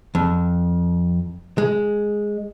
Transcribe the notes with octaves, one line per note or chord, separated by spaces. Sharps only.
F2
G#3